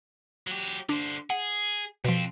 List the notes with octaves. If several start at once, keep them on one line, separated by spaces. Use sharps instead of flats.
F#3 G4
D3 D4 C5
G#4 F#5
F2 B2 F3 C4